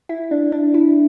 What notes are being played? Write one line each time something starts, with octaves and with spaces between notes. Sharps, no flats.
E4
D4
D4
E4